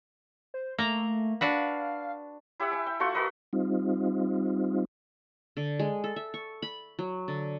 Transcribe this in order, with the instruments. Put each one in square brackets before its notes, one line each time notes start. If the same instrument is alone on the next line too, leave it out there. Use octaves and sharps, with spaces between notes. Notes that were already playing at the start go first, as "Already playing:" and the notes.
[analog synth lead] C5
[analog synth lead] A3 [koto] A#3 A#5
[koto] D4 F#4 B4 [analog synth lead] F5
[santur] E4 G4 E5 F#5
E5 G#5
G5
A3 F4 F#4 C#6
F#4 A#4 B4 D#5
[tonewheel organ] G3 C4 D#4 F4
[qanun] D3
G#3
A4
E5
C#6
B5
F#3
D3